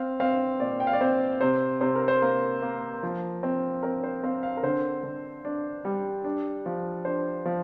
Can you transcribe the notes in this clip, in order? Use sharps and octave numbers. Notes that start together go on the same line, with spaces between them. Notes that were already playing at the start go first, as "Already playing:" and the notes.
Already playing: C4 F5
C4 F5
A#2 D5
G5
F5
D5
C4 C5
C3 C5
C3 C5
A#4
C5
A#3 A#4
A#3
F3
C4
C4 A#4
C5
C4 F5
F5
A#4
D3 C5
D3
D4
G3
D4
F3
D4 C5
F3